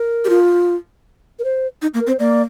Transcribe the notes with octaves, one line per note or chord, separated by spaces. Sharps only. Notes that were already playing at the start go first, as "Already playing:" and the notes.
Already playing: A#4
G4
F4
A#4
C5
D#4
A#3
A#4
C4
C5
A#3 D5